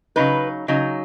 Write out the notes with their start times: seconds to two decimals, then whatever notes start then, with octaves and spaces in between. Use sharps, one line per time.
0.16 C#3 F#3 D#4 B4
0.68 C#3 F#3 D#4